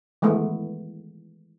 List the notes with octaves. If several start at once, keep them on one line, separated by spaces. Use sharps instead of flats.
D#3 E3 G#3 A3 B3